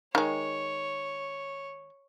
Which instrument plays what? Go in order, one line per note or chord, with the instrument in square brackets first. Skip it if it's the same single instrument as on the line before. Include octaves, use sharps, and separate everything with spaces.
[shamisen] D#3 G#3 [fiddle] C#5